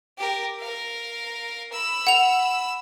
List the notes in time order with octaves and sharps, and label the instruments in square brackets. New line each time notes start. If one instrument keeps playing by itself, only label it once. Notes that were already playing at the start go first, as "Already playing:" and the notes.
[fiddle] G4 A#4
A#4 F5
B5 E6
[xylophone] F#5 F7